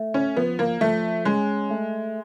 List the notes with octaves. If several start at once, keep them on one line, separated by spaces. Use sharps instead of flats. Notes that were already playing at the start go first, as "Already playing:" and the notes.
Already playing: A3
C#4
F3 B3
A#3
F3 A3
G#3 C#4
A3